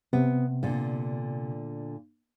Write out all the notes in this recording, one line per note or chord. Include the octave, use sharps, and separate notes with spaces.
C3 B3
A#2 D3